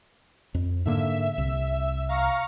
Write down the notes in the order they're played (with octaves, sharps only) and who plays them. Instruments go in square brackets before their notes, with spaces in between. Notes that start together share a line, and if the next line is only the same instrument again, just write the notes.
[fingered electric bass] F2
[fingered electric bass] G#2 D3 A#3 [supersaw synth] E5
[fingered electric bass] C2
[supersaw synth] F5 A#5 C#6